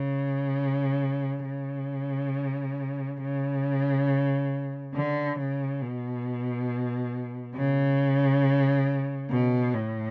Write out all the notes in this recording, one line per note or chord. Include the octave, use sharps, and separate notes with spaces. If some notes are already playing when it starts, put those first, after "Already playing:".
Already playing: C#3
C#3
C#3
D3
C#3
B2
C#3
B2
A2